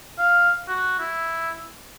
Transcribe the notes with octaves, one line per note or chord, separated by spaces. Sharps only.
F5
F#4
E4